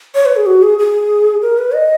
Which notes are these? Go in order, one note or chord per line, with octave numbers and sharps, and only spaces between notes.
C#5
B4
G#4
F#4
G#4
G#4
A#4
B4
D#5